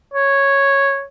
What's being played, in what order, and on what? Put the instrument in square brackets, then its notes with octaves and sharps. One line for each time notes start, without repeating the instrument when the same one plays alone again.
[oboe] C#5